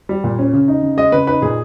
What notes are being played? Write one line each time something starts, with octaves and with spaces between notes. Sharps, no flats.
G3
A#2
C#4
C#3
D#4
C#3
G#3 D#5
C#3 B4
D#4 B4
A#2 G#4